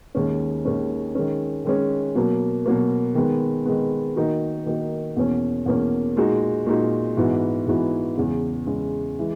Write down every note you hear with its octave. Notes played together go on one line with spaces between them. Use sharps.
D#2 D#3 G#3 C#4
D#2 D#3 G#3 C#4
D#3 G#3 C#4
D#3 G#3 C#4
B2 F#3 A#3
B2 F#3 A#3
D#3 G#3 B3
D#3 G#3 B3
D#3 A#3 D#4 F#4
D#3 A#3 D#4 F#4
E2 B2 A#3 C#4
E2 B2 A#3 C#4
A#2 G#3 D#4 F#4
A#2 G#3 D#4 F#4
G#2 E3 B3 F#4
G#2 E3 B3 F#4
E2 C#3 G#3
E2 C#3 G#3
E3 G#3